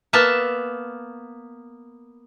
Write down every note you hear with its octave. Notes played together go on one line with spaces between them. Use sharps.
A#3 B3 E5 A5